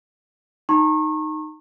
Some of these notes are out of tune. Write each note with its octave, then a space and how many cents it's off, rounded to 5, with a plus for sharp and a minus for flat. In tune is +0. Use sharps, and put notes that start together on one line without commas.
D#4 +0 A#5 -40 C#6 -35